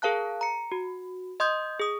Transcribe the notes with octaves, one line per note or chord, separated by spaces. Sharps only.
G#4 A#4 F5 A5 F#6
A#5 C#7
F#4
D#5 C6 D#6 G6
G#4 D#6